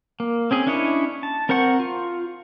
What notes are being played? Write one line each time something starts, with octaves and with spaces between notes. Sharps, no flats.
A#3
C4 C#4 G#4
C#4 D4 E4 C#5 D#5
A5
C4 A#4 C5 F#5 C#6
F4